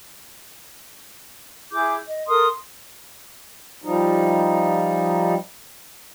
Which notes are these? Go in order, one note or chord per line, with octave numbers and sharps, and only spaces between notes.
E4 G#4 D6 G6
D#5
A4 A#4 C6 D#6
F3 G3 D#4